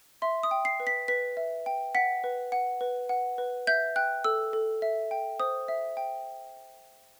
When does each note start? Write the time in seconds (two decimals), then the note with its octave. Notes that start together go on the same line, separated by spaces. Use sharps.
0.22 E5 C6
0.43 D#6
0.51 G5
0.65 C7
0.80 B4
0.87 B6
1.08 B4 B6
1.37 E5
1.66 G5
1.95 F#5 B6
2.24 B4
2.52 F#5
2.81 B4
3.09 F#5
3.38 B4
3.67 E5 G6
3.96 G5 F#6
4.24 A4 E6
4.53 A4
4.82 E5
5.11 G5
5.40 C5 D#6
5.68 E5
5.97 G5